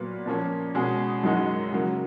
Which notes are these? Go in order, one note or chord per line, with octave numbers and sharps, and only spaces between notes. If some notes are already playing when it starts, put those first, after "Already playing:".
Already playing: A#2 F#3 B3 F4 B4
A#2 F3 A#3 C#4
B2 G#3 C#4 G#4
F#2 D#3 G#3 D#4 F#4
C#3 F#3 A#3